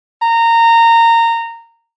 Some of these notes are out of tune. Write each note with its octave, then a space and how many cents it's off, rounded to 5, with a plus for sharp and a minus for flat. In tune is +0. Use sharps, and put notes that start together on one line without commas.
A#5 -20